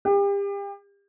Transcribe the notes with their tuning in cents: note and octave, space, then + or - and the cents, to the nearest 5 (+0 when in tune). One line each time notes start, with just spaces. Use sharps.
G4 +35